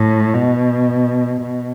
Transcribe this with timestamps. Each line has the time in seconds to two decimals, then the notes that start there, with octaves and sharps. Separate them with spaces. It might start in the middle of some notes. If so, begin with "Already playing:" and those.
Already playing: A2
0.34 B2
1.41 B2